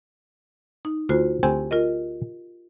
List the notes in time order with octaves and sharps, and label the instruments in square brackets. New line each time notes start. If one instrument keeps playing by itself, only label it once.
[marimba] D#4
[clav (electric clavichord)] D2 [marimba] F4 F#4 C5
[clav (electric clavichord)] D2 C4 G#5 [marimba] G4
[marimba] F4 A#4 D#5